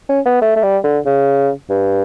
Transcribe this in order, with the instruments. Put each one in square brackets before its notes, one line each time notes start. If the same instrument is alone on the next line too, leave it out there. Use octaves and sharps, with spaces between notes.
[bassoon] C#4
B3
A3
A3
G3
D3
C#3
G2